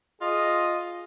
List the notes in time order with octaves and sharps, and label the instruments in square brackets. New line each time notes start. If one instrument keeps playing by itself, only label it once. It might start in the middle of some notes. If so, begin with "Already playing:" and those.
[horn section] F4 G#4 D#5